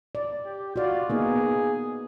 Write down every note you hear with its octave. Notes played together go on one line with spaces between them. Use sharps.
D5
G4
F4 F#4 D5
A#3 B3 D#4 G#4